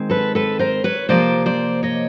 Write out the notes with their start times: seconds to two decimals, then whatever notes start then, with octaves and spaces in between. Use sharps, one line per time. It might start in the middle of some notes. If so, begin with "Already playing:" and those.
Already playing: D#3 G#3 C4
0.10 A4 B4
0.35 A4 B4
0.59 A#4 C5
0.84 B4 C#5
1.09 C3 F3 A#3 C5 D5
1.46 C5 D5
1.83 C#5 D#5